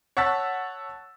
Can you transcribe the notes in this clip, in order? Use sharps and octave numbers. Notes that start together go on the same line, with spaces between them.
C#5 F#5 A5 E6 A6 B6